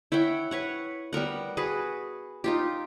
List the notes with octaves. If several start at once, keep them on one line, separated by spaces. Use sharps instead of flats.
E4 C#5 F#5 G5
B4 C#5 F#5
G3 B3 A#4 F#5
F#4 G#4 B4
D#4 F4 G4